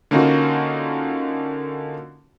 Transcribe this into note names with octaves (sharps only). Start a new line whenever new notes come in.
D3 A#3 C#4 D#4 F4 F#4